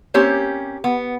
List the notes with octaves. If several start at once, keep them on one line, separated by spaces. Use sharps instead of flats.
A#3 C4 C#4 G4
B3